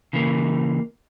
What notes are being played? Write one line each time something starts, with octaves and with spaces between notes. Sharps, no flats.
C#3 E3 A#3